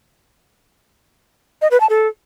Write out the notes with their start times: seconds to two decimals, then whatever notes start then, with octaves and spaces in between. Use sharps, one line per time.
1.62 D#5
1.71 B4
1.80 A5
1.90 A4